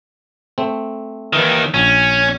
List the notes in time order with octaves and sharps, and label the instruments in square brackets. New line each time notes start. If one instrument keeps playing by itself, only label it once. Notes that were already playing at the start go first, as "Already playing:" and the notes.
[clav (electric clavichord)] A3 C4
[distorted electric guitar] D#2 D#3 [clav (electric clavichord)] E3
[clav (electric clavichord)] A#1 [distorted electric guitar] C#4